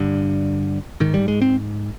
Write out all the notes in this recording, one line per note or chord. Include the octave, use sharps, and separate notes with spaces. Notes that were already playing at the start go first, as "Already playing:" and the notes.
Already playing: G2 D3
G#2 D#3
G3
G#3
C4